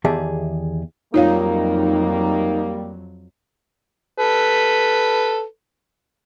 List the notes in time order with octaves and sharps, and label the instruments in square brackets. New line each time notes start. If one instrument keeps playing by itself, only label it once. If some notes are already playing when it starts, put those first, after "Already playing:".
[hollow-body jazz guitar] E2 D#3 G4 G#4 E5 A5
[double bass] F2 F#3 [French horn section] G3 A#3 [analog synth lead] D#4 [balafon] F4 C#5 F5
[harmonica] A4 B4